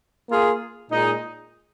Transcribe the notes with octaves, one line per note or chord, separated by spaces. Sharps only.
A#3 F4 G#4
A#2 G#3 D#4